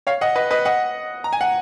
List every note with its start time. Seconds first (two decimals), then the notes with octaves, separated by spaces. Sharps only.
0.07 C#5 F5
0.21 D#5 F#5
0.36 B4 D#5
0.51 B4 D#5
0.65 D#5 F#5
1.24 A#5
1.33 G#5
1.41 F#5